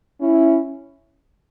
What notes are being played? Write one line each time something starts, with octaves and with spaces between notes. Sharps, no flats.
C#4 E4